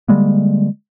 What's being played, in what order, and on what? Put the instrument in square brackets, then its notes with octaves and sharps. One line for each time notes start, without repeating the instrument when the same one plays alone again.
[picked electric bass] D3 G3 G#3 A#3